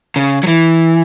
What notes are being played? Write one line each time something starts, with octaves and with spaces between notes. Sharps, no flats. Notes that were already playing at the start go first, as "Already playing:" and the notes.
C#3
F#3
E3